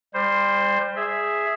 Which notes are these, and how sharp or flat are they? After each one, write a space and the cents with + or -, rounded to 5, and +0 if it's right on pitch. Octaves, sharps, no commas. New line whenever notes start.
G3 +30 C5 +0
G#4 +0 E5 +0